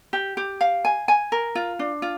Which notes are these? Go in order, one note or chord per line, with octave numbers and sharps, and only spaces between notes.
G4
G4
F5
G#5
G#5
A#4
F4
D4
F4